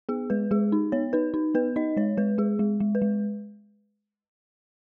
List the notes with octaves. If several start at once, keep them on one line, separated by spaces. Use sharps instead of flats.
B3 G#4
G#3 B4
G#3 G#4
D#4
B3 C#5
D#4 B4
D#4
B3 B4
D#4 D#5
G#3 C#5
G#3 B4
G#3 G#4
G#3
G#3
B4
G#3